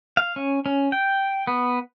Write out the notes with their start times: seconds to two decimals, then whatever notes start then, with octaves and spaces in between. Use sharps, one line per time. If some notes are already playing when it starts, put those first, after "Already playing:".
0.17 F5
0.36 C#4
0.66 C#4
0.92 G5
1.47 B3